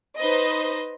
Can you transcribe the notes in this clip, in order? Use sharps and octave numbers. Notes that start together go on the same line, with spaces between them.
D#4 B4 C5 D#5